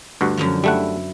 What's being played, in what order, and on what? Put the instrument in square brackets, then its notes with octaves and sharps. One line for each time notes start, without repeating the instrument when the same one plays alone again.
[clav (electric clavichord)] D2 G2 F#4
[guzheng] F#2 D3 F3
[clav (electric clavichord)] G3 A3 F#5 [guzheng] E4